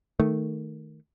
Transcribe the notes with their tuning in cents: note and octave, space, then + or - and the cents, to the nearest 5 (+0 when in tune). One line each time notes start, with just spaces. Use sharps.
D#3 +0 A3 +0